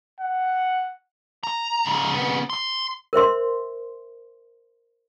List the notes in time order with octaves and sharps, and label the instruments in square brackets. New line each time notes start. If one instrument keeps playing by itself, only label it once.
[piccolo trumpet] F#5
[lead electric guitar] A#5
G#2 C#3
C#3 B3
C6
[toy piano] A#4 C5 E5 C6